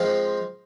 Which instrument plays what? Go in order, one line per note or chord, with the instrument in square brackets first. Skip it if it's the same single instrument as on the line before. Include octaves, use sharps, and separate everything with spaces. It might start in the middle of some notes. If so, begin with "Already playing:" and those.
Already playing: [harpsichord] F3 G#3 C4 F4